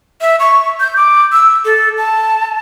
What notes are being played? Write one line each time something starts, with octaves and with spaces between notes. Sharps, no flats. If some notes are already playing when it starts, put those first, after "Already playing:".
E5
C#6
G6
D6
E6
A4
A5